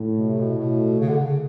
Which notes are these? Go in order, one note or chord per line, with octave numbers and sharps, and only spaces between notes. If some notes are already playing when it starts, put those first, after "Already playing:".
Already playing: A2
B2
C3
B2
B2
C#3
D3
C#3